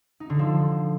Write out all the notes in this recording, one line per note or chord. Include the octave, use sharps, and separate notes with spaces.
D#4
D3
F3